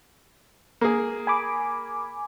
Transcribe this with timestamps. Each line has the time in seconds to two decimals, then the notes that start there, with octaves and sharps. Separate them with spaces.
0.81 A#3 G#4
1.27 G#5 B5 D6